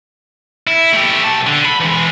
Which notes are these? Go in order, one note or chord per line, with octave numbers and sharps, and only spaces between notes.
E4
A3 G4
B1 A5
D3
B5
E3 G#3